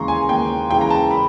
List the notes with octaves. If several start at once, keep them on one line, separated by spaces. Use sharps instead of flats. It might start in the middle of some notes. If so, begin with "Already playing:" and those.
Already playing: D#2 C#3 E3 G#3 A#5 C6 C#6
G#5
D#2 G5
C#3 E3 G#3 G5
A#5
A5
B5